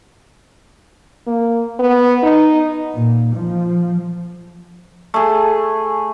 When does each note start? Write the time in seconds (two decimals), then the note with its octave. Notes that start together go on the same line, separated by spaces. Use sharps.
1.27 A#3
1.79 B3
2.23 D#4
2.95 A#2
3.35 F3
5.14 A3 G#4